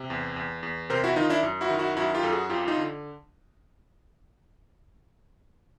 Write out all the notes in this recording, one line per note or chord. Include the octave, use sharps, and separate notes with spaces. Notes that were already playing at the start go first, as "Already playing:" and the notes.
Already playing: C3
E2
E2
E2
C3 A#4 C5
E4 F#4
D#3 D#4 F4
D4 E4
F#2
E4 F#4
D#3
E4 F#4
F#2 E4 F#4
F4 G4
F#2 A4
F#4 G#4
F2 F4 G4
D#4 F4
D3